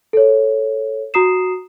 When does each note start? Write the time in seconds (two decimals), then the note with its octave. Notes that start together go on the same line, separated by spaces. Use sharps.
0.13 A4 C#5
1.14 F#4 A#5 D#6 C7 E7